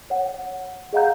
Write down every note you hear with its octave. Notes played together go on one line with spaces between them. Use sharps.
C#5 F#5
G#4 D#5 F5 F#5 A#5 G6